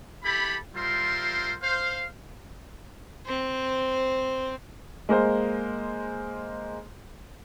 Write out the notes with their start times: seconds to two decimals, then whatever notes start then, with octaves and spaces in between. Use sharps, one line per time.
0.23 E4 G4 A4 B5
0.75 G3 F4 A#4 C5 E5 C6
1.61 C5 F5
3.25 C4 C5
5.09 G#3 A#3 C5